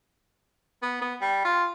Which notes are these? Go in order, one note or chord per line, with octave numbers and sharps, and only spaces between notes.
B3
B3
G3
F4